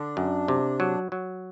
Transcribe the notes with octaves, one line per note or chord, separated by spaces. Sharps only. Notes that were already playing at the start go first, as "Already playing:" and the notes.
Already playing: D3 D4
F#2
C3
F#3
F#3